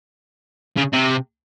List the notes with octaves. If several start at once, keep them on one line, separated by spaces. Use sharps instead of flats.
C#3
C3